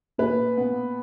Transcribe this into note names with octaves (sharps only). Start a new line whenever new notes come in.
A#2 B4
B3